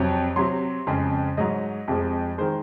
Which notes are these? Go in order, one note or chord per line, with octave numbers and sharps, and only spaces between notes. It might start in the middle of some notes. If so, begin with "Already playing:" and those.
Already playing: F2 C3 F#3
C3 F#3 C6
F2 C#3 G#3
G#2 F#3 D#5
F2 C3 F3 G#3
D#3 G#3 C5